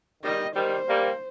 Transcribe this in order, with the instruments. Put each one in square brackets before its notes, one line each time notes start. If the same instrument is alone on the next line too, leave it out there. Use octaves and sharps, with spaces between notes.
[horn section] D#3 G3 [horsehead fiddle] D#5
[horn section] D#3 G3 [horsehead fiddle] C5
[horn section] G3 A#3